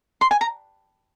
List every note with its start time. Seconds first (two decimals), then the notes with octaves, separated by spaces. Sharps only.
0.21 C6
0.31 G#5
0.41 A#5